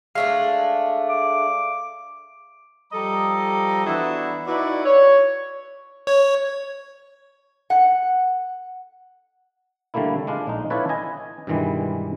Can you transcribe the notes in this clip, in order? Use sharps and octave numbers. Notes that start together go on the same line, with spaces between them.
G#3 A3 D4 F5
D6
F3 G3 A4 D#5 A#5
E3 B3 D4 E4 F#4 B4
D#4 E4 F#4 B4 D5
C#5
C#5
F#5
D3 G3 A3 A#3 E4
G#3 D4 F4
A#1 D#4
D4 E4 F4 A4 B4 C#5
D#5 G#5
G2 B2 D#3 E3 G3 G#3